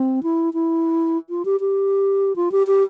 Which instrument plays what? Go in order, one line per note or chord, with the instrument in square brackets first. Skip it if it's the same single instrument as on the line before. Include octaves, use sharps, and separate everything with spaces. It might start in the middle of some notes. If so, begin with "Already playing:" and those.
Already playing: [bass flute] C4
E4
E4
F4
G4
G4
F4
G4
G4